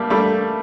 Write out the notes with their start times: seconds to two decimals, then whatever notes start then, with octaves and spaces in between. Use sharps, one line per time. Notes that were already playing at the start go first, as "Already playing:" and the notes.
Already playing: G3 A3 A#3
0.10 G3 A3